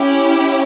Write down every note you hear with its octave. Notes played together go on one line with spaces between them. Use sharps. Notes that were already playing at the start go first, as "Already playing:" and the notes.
Already playing: C#4 E4 G4